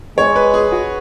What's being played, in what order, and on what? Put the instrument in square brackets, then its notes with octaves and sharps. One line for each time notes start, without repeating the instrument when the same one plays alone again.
[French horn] G#3 [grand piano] C#5
[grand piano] B4
G#4
F#4